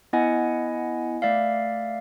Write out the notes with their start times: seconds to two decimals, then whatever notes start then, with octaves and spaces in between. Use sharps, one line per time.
0.13 B3 E4 D#5 F#5 G#5
1.22 A3 D5 E5 F5